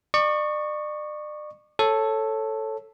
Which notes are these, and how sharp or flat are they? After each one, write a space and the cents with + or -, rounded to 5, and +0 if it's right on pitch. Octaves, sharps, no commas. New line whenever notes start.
D5 +40 C#6 +0
A4 +0 C#5 -10